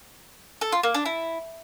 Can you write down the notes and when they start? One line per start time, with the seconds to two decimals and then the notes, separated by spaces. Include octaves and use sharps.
0.61 A4
0.72 F4
0.83 A#3
0.94 D4
1.06 E4